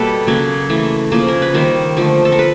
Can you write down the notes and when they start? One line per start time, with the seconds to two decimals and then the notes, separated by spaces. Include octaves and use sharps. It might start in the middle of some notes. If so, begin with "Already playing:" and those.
Already playing: B2 G3 A#3 A4 B4
0.27 C#3 F#3 A#3
0.70 E3 A3
1.12 C#3 F3 A#3
1.28 A#4
1.42 B4
1.54 D#3 G3 A#3 A#4 C5
1.97 D3 F3 A3
2.25 A4
2.32 A#4
2.39 B4